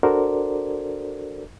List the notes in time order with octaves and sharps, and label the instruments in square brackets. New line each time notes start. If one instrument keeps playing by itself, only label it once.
[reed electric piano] D4 F#4 A4 A#4 C5 D5